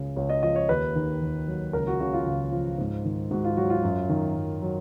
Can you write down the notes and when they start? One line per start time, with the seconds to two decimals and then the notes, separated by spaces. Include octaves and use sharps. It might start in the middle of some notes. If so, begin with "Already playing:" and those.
Already playing: C#2 C#3
0.16 C#2 C#5
0.29 D#5
0.43 F3 D#5
0.56 C#5
0.69 D#2 B4
0.95 D#3
1.21 D#2
1.48 F#3
1.73 C#2 A#4
1.87 F#4
2.00 C#3 F#4
2.13 F4
2.26 C#2
2.52 F3
2.78 G#2
3.05 D#3
3.31 G#2 F#4
3.44 F4
3.57 F#3 F#4
3.70 F4
3.84 F#2
4.09 D#3
4.36 F#2
4.62 F#3